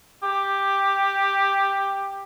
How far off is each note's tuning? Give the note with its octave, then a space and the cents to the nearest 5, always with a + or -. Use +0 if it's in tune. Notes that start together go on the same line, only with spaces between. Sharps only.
G4 +5